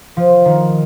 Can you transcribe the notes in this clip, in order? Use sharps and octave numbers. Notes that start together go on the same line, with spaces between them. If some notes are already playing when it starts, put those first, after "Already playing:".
F3
D#3